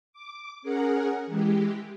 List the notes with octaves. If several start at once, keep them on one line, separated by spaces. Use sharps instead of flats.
D6
C#4 G#4 A#4 F#5
E3 G#3 G4